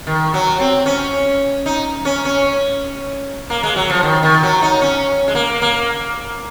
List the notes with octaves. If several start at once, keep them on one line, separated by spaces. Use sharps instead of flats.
D#3
F#3
C4
C#4
D#4
C#4
C#4
A#3
G#3
F#3
F3
D#3
D#3
F#3
D#4
C#4
G#3
A#3
A#3